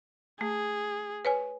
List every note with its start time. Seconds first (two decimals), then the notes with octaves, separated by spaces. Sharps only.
0.41 A3 G#4
1.25 B4 C#5 G#5